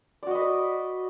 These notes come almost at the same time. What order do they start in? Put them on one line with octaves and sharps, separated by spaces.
D5 F#4 D#5 B4